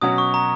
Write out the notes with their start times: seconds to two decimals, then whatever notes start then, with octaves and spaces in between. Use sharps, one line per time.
0.01 B2 F#3 C#4 F#4 D#6
0.18 C#6
0.34 A#5